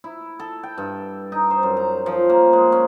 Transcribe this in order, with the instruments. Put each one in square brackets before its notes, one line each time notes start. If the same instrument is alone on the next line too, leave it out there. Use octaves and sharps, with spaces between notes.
[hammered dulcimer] E4
A4
G5
G2
D#4
C5
F#2
A#5
F3
A#3
G#3
C#4